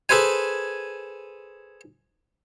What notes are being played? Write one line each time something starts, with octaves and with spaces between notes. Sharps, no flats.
G#4 A4 B4 C5 G#5